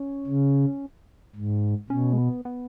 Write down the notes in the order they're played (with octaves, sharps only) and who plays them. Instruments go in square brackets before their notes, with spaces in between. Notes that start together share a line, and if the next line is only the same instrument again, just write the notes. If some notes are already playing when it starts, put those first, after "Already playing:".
Already playing: [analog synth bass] C#4
[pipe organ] C#3
G#2
[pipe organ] B2 [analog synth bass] C#4
[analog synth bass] G#3
B3
B3